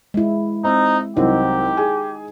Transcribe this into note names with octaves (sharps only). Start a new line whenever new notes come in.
G#3 E4
C4 D#4
C2 F#3 C4 D#4 G4
G#4 G#5